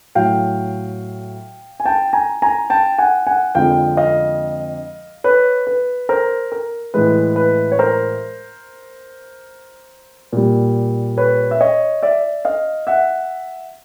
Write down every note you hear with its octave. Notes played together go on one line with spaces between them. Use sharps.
A2 F#3 F5 G5
G#5
G5 A5
G#5 A#5
G#5 A#5
G5 A5
F#5 G#5
F#5 G#5
F2 D3 F3 G#3 F5 G5
D#5 F5
B4 C#5
B4
A#4 C5
A#4
A2 E3 G#3 B4
B4
C#5
A#4 C5
A#2 G3
B4 C#5
E5
C#5 D#5
D5 E5
D#5 F5
E5 F#5